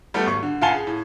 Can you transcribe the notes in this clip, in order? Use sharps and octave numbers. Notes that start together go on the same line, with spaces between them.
G3 A3 B3 A4
G#1 C#6
D3
C#2 F5 F#5 G#5 A5 G7
G#4
A2